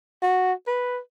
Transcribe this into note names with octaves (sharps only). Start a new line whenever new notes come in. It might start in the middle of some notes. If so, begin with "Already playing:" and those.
F#4
B4